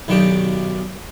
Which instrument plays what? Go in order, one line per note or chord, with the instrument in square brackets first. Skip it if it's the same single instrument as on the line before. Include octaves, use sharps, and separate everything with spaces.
[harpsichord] B1 D#3 D4 G4